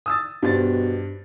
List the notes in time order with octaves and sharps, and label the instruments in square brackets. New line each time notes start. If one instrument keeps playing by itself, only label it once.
[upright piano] D#6 E6 A6
[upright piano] G2 C5 A6 [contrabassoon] B2